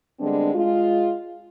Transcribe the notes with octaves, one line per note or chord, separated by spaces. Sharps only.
D3 G3 G#3 B3 C4 D4
G#3 F4